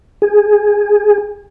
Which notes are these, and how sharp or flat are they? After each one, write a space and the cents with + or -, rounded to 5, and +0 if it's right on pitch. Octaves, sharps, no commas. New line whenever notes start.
G#4 -10